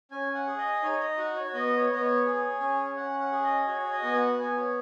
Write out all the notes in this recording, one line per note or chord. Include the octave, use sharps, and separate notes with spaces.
C#4 G#5
F#5
G#4
D#5
D#4 C#5
D#5
F#4 F#5
C#5
C#5
B3 D#5
C#5
B3 D#5
C#5
G#4
C#4
C#4 F#5
F#5
G#4
D#5
F#4 C#5
C#5
D#5
B3 G#5
F#5
B3 G#5
C#5